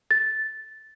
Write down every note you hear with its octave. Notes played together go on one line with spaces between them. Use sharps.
A6